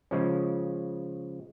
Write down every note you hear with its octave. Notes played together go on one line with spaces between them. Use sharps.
C#3 F3 G#3 C#4